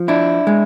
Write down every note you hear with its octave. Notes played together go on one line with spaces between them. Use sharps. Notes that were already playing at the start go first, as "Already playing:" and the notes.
Already playing: F3
D4 E4
G#3